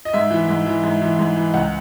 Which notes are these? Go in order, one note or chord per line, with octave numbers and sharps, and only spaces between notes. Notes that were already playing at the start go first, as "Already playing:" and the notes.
D#5
G#2 E5
E3
G#2
E3
G#2
E3
G#2
E3
C#2 F#5